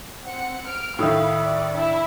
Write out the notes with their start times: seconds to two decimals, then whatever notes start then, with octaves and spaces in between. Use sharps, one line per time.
0.24 C4 F#5 C#7
0.69 F6 D7
0.99 A2 D#3 E5 F5 B5 D#6 E6
1.41 D5
1.73 D4 E4 E5